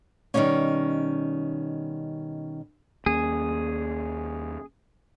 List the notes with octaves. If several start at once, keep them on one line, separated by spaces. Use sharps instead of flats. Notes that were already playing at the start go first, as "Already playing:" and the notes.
B2 D#3 F3 G3 A#3 C#4
D#2 A#3 C#4 G#4